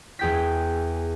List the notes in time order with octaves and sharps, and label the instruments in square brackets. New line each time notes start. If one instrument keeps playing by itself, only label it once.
[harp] E2 G#4 G5 G6 B6